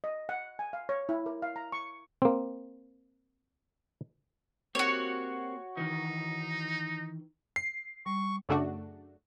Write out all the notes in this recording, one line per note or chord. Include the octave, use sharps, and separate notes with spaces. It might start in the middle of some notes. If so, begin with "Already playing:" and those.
D#5
F#5
G#5
F5
C#5
E4
A#4
F5
A#5
C#6
A#3 C4
A#3 C4 F#4 G4 C#5
D#3 E3 D#4
C7
G3 C#6
F#2 C#3 A3 D4 F#4